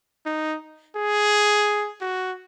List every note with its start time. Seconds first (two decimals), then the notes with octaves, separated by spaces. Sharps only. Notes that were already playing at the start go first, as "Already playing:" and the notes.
0.26 D#4
0.96 G#4
2.01 F#4